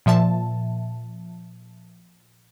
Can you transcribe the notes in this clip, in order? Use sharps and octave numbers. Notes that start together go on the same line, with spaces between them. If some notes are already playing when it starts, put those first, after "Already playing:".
A#2 F3 E5 A5